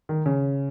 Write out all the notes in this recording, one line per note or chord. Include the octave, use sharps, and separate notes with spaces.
D#3
C#3